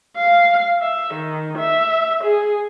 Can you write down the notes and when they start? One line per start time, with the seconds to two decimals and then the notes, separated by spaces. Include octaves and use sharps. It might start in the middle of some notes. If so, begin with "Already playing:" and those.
0.17 F5
0.81 E5
1.14 D#3
1.58 E5
2.24 G#4